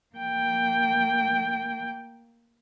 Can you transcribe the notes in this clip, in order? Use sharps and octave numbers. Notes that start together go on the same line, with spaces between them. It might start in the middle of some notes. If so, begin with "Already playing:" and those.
A#3 G5